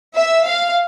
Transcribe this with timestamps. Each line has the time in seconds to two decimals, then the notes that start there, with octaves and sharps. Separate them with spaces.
0.15 E5
0.44 F5